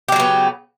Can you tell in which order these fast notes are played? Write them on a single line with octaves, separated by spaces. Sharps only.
G4 F#3 C#3 B3